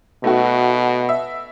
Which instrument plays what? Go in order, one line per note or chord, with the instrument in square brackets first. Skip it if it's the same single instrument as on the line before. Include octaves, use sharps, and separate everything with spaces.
[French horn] B2 [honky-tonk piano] A3 D#4 F#4
[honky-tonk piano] E5